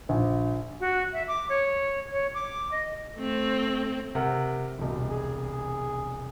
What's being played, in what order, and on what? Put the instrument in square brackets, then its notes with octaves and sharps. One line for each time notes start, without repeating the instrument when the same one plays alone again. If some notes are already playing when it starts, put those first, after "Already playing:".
[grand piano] A#1
[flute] F#4
E5
D6
C#5
C#5
D6
D#5
[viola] A3 C4
[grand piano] C3 A#4 F#5
[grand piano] E1 C2 [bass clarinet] B2
[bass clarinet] G#4